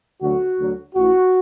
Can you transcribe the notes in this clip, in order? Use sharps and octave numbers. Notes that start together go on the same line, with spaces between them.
D2 D3 F#3 F#4
D2 D3 F#3
A1 A2 E3 F#4